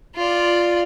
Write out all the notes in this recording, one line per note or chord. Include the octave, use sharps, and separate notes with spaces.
F4 D5